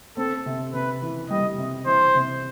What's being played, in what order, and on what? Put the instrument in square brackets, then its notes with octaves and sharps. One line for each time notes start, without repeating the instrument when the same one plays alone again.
[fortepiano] C4 [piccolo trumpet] A4
[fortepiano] C3
[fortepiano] C3 [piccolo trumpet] B4
[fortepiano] E3
[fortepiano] G3 [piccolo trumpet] D#5
[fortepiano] C3
[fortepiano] E3 [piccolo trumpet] C5
[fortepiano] C3